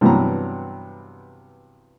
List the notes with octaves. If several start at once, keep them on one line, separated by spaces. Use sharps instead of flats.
G2 C3 E3 F#3 B3 A#5